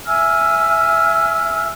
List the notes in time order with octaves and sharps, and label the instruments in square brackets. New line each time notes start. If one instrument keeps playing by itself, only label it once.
[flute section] E5 G#5 E6 F6